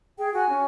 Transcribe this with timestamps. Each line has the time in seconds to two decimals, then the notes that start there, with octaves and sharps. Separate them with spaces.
0.18 G#4 G5
0.33 F#4 G#5
0.49 C#4